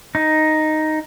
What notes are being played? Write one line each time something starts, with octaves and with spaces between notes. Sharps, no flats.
D#4